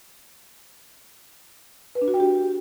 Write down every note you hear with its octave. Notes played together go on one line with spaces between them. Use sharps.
B4
D4
F#4
G5
G4